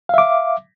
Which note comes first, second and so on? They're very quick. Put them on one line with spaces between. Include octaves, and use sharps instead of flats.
F5 E5 D6